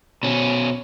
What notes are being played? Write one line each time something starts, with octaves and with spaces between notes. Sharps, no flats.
B2 C#4